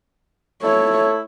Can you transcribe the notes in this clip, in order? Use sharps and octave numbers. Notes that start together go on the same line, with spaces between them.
A3 E4 A4 C#5